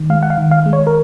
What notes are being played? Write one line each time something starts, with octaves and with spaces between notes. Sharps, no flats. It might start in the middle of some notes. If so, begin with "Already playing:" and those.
Already playing: D#3
G#3 F5
F#5
F5
D#3
F5
G#3
C#5
A#4